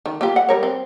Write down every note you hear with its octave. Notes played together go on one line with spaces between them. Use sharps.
D#3
A#3 F4 G4
F#5
G3 A#4 C#5
C4